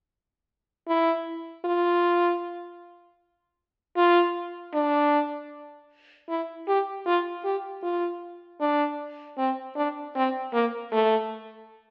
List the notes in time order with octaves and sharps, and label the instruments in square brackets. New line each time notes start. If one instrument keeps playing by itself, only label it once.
[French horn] E4
F4
F4
D4
E4
G4
F4
G4
F4
D4
C4
D4
C4
A#3
A3